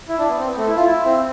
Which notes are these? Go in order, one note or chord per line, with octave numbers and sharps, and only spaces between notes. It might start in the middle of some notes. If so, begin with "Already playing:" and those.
E4
D4
B3
C4
B3
A3
E4
F4
E4
C4